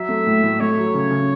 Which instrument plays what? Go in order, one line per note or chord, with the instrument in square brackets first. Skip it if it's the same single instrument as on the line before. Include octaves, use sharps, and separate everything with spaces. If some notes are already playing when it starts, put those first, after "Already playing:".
Already playing: [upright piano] F#3 [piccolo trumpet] E5
[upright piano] A3
A2
A2
[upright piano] A3 [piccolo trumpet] C#5
[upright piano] F#3
C#3
C#3